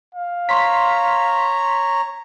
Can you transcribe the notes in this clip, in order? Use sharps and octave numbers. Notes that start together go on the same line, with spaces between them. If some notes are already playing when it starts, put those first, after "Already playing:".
F5
C#5 A#5 C6 B6